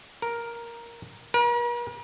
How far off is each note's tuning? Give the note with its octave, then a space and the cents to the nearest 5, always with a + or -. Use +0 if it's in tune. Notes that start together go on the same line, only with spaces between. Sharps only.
A#4 +5
A#4 +45